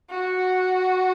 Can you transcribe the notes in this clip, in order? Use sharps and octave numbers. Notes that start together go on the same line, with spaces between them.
F#4